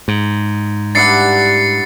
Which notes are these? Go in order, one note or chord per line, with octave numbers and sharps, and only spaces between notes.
G#2
G2 E4 F#5 A6 C7 C#7